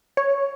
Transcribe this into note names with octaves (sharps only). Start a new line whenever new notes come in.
C#5